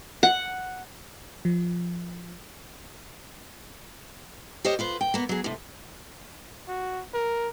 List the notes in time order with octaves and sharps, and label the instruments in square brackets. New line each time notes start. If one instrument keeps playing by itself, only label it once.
[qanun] F#5
[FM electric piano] F3
[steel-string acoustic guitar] G4 A#4 C5 C#5 D#5
F4 B4 C5
G5
A#3 B3
F#3 G#4
A2 C3
[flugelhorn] F#4
A#4